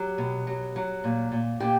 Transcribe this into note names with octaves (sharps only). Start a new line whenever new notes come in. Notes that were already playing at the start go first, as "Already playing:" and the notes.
Already playing: F#3 G4
B2
F#3
F#3
A#2
A#2
A#2 G4 G5